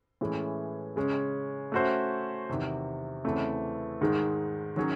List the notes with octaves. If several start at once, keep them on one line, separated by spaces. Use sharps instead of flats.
A2 E3 G#3 C#4
C#3 G#3 C#4
A3 C#4 F#4 C5 E5
E2 C3 D#3
E2 C#3 E3 A3 C4
G#2 D#3 G#3
D#3 F#3 C#4 G#4